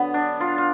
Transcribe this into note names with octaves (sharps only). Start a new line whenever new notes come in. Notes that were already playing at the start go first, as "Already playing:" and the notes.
Already playing: D3 F#3 B3
D4
F4
F4